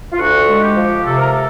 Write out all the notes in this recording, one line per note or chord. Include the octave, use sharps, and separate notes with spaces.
F4
D2 F#4
G#3
G4
F3
C3 A4
A#4
A4